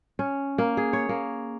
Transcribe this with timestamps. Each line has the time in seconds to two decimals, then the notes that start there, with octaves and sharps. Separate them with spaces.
0.19 C#4
0.58 A#3
0.77 G#4
0.93 C#5
1.09 A#3